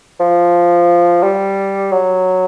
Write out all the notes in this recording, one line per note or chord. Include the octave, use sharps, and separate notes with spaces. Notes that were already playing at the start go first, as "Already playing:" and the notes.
F3
G3
F#3